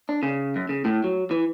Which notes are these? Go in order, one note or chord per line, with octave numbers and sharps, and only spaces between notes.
D4
C#3
F#2
C#3
A2
F#3
E3